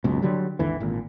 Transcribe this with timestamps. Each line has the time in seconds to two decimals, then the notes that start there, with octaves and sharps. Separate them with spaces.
0.04 F#1 C#2 B2
0.22 D3 F#3 G3
0.59 G#1 D#2 D3 E3
0.80 G#1 A#2